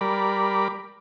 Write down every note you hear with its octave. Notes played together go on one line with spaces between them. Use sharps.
G3 A#4 D5 B5